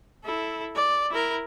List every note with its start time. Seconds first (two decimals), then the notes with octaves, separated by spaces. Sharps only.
0.24 E4 A4
0.76 D5
1.11 E4 A#4